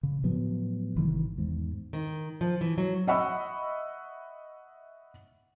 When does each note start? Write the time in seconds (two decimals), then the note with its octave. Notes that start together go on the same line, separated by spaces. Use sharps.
0.03 C#3
0.23 A2 F3 F#3 B3
0.96 G#1 C3 D#3 E3
1.37 E2 G#2
1.93 D#3
2.41 F3
2.61 E3
2.78 F#3
3.07 D#5 E5 F#5 B5 C#6 E6